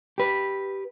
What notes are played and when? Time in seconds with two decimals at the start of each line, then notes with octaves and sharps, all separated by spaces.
0.18 G4 B4